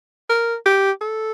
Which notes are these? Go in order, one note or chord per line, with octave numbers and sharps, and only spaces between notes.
A#4
G4
A4